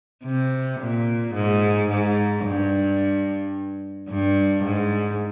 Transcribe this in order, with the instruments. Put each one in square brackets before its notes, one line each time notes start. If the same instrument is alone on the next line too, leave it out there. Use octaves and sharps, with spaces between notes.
[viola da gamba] C3
A#2
G#2
G#2
G2
G2
G#2